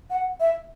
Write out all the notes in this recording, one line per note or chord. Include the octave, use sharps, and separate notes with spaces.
F#5
E5